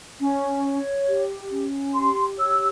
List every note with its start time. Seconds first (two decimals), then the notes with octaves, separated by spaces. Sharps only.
0.20 C#4
0.63 C#5
1.07 G4
1.51 C#4
1.94 G4 C6
2.38 C#5 E6